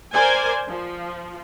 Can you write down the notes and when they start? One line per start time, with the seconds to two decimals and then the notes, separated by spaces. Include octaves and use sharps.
0.13 A#4 C5 D5 G#5
0.68 F3